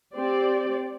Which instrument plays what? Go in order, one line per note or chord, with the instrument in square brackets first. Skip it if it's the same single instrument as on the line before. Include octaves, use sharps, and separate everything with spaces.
[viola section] C4 G4 D5